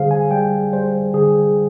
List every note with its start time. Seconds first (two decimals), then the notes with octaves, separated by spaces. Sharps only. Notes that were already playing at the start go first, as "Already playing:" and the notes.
Already playing: D3 G3 G#4 C5 F5
0.11 G#5
0.31 G3 G5
0.72 G3 C5
1.14 D3 G#4